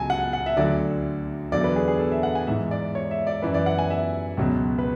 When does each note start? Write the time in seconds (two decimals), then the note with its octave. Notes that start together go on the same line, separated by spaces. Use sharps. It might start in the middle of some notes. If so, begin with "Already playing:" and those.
Already playing: C#2 C#3 F#3 G#5 A5
0.10 F#5
0.33 F#5
0.46 E5
0.57 D2 D3 F#3 D5
1.52 E2 D3 F#3 D5
1.64 B4
1.76 G#4
1.88 G#4
2.00 A4
2.12 E5
2.23 F#5
2.35 G#5
2.47 G#2 E3 E5
2.71 D5
2.95 C#5
3.11 E5
3.27 D5
3.42 F#2 E3 B4
3.54 D5
3.66 F#5
3.79 G#5
3.90 E5
4.37 C#2 B2 F#3
4.79 B4